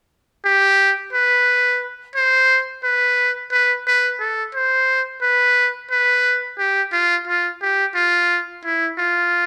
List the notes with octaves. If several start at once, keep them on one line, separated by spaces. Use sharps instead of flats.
G4
B4
C5
B4
B4
B4
A4
C5
B4
B4
G4
F4
F4
G4
F4
E4
F4